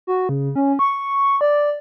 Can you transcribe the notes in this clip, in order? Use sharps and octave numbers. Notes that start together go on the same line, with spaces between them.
F#4
C#3
C#4
C#6
D5